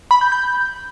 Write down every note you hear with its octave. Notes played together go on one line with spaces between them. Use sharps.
B5
G6
G6